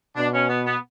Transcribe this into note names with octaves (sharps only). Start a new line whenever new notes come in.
B2 D4
C#4
B3
B3